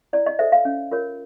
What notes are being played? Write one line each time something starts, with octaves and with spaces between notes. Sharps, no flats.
E4 D5
D#5
A4 C5 E5
F5
C#4
F4 A#4 C#5